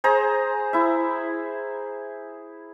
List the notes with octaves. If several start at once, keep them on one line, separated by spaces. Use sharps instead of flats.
G#4 C5 A#5
E4 E5